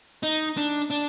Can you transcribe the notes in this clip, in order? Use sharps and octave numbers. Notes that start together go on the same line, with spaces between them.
D#4
D4
D4